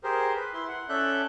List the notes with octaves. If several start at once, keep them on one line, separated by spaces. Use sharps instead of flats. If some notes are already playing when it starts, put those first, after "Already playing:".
G4 G#4 A#4 C5
B4
E4 C6
F#5
C#4 A4 D5 E5 F#6 G6